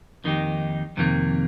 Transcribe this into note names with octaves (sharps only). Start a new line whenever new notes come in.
F2 D#3 A#3 D#4 G4
F2 C3 D#3 A#3